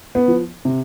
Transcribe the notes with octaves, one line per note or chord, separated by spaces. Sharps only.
B3
F3
C3